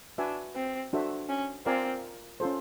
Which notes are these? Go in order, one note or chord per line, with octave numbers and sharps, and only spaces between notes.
D4 F#4 B4 E5 G#5
C4
D4 F#4 A4 C5 E5
C#4
C4 F4 A#4 D5 F5 G#5
C#4 F4 A4 C5